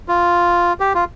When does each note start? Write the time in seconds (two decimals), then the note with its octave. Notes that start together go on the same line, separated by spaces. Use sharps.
0.08 F4
0.80 G4
0.95 F4